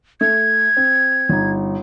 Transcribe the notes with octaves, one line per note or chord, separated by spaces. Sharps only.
A3 G#6
C4
G1 D#4